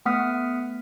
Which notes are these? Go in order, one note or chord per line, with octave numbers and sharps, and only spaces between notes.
A3 B3 F#5 D#6 F6 B6